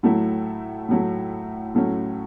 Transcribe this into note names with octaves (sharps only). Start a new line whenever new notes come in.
A2 F#3 A3 E4
A2 F#3 A3 E4
A2 F#3 A3 C#4